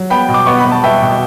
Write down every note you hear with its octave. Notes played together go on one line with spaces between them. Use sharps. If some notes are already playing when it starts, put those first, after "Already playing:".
Already playing: F#3
B3 G5 B5
B2
D6
B3 C#6
B5
B3
A5
B3 E5 G5
B2